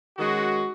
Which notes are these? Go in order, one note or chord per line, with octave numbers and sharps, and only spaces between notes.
D#3 G#3 C#4 F#4